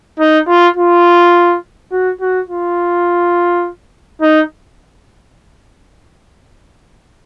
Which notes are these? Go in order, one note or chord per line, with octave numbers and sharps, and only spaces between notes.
D#4
F4
F4
F#4
F#4
F4
D#4